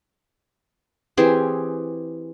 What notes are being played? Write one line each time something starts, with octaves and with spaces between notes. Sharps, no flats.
E3 C4 G4 G#4